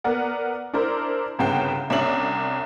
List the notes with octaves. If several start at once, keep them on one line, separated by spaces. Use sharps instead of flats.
B3 A#4 D5 F#5
D4 E4 A#4 C5
G1 C2 C#3 B3 G5 C7
C2 C#4 D4 E5 C7 F#7